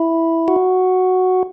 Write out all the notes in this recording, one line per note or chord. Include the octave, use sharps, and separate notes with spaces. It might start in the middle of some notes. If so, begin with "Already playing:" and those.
Already playing: E4
F#4